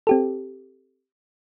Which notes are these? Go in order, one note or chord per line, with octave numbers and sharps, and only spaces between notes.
C4 G4 A4